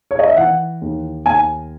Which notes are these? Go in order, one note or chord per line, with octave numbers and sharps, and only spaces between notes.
C#5
D#5
E5
E3 F#5
D#2
D#2 G#5